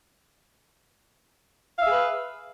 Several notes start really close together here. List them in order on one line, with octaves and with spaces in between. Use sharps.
F5 E5 G#4 B4